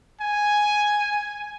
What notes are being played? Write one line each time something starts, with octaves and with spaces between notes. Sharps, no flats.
G#5